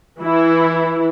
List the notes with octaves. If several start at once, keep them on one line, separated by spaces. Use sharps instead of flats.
E3 E4